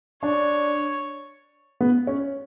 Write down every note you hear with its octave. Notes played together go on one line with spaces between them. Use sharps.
D4 C#5
B3
C#4